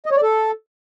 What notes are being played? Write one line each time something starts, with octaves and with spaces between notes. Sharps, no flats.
D#5
C#5
D5
A4